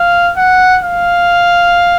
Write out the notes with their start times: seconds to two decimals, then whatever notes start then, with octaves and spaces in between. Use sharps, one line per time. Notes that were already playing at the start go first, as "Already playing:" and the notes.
Already playing: F5
0.36 F#5
0.84 F5